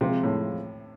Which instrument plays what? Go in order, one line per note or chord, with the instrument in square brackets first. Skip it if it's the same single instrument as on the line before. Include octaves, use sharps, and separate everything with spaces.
[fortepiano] C3 [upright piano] F3 G#3 C4 F4
[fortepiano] A2